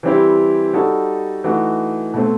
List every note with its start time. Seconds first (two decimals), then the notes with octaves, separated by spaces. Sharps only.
0.03 E3 G3 C4 E4 G4
0.73 G3 D#4 F#4 A4
1.44 E3 A3 D#4 F#4
2.14 B2 A3 C4